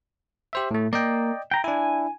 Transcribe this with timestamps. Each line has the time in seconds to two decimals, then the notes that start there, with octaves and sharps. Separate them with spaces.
0.53 G4 C5 E5
0.71 A2 A3
0.93 A#3 D5 D#5 G5
1.51 G5 A#5
1.64 D4 E4 G#5